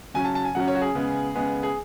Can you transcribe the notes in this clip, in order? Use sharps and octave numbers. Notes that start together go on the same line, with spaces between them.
C#3 F#3 C#4 G#5
A5
A5
G#5
C#3 F#3 C#4 F#5
C#5
F#4
G#4
C#3 G#3 B3
C#3 G#3 B3
G#4